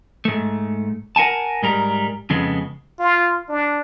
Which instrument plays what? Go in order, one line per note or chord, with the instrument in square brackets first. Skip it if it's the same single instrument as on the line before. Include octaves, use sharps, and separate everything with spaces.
[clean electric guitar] G#2 A3
A#4 F#5 G#5 A5
G#2 G3 A#4
F2 C#3 G#3 B3
[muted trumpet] F4
D4